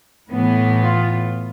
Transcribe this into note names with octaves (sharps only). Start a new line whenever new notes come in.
A2 E3 B3
F4